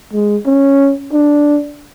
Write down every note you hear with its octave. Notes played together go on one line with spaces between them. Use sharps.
G#3
C#4
D4